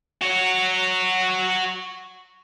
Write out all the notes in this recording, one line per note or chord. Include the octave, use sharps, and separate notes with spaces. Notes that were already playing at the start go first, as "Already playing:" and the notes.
F#4 C#5